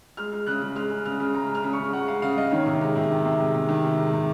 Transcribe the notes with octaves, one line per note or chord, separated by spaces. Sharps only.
G#3 F6
G#3
C#3 F#6
C#3
G#3 F6
G#3
C#3 F6
C#3
G#3 A#5
G#3
F6
C#3
C#6
C#3
G#3 F#5
G#3 F5
C#3 F5
C#3 D#5
D#3 C#5
C3
G#3
C3
D#3
C3
G#3
C3
D#3
C3
G#3
C3